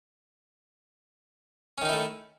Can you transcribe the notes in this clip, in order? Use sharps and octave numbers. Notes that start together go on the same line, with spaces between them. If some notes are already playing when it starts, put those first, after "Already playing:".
D#3 A3 C#4 D#4 E4